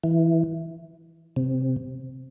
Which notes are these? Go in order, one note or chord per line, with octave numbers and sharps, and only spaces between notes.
E3
C3